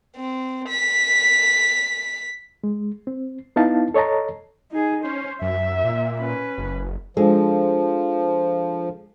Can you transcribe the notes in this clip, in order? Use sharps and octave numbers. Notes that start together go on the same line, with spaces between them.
C4
B6
G#3
C4
B3 D#4 E4 F5 A5
A4 C#5 D#5 A5 A#5
D#4 G#4
C#4 C5
F#2 E5
A#2
C#4 B4
F#1
F3 G#3 D4 F4 A4